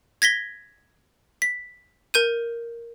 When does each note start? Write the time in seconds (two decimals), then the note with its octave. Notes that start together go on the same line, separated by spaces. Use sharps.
0.22 G#6 A#6 B6 G7
1.42 B6
2.14 A#4 G6 D#7